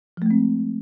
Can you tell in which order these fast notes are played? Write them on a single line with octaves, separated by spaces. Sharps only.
F3 A3 G#3 C4